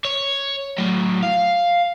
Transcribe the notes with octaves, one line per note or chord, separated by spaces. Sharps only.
C#5
A2 F#3
F5